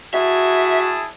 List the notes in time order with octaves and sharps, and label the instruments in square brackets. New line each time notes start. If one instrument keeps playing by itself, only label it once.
[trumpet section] E4 G#4 A5 [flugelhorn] F#4 [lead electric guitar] E5